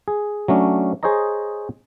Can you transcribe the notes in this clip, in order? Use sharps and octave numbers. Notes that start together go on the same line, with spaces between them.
G#4
F#3 A3 C#4 D4
G#4 C5 C#5 D#5 A#5